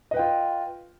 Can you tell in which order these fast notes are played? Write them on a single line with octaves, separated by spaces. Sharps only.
D#5 B4 G5 F4